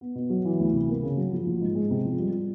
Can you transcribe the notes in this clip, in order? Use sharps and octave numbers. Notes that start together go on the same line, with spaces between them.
B3
B2
F#3
E3
D2
C3
A#3
C#3
F#3
F3
A#1
G#2
G#3
C3
F3
G3